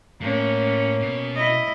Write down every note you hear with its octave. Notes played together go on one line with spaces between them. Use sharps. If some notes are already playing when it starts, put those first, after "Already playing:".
A2 A#3 C#4
B2
E4 D#5